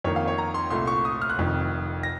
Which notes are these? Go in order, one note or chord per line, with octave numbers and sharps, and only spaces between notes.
F2 D#3 A#3 C#5
F5
C#5
A#5
C6
C2 A#2 A3 C6
C#6
D#6
F6
F#6
F1 F2 D#3
A#6